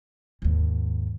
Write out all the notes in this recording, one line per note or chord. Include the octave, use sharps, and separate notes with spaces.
D#2 G#2